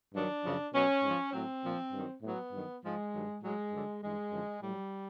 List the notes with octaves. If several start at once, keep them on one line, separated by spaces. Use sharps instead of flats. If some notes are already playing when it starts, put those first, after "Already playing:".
G2 D#3 F#3 D4
F#2 C#3 F3
B2 F#3 C#4
G#2 F3
A2 F#3 C4
A#2 F3
G2 D#3 F#3
A2 F#3 B3
G2 D#3 F#3
G#2 F3 G#3
G2 D#3 F#3
A2 F#3 G#3
G2 D3 F#3
G2 E3 G#3
F#2 D3 F3
A2 F#3 G3